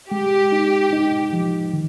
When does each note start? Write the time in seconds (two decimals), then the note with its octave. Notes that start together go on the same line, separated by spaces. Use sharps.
0.11 G#3 G4
0.52 D#4
0.93 D#4
1.33 F3
1.73 D#3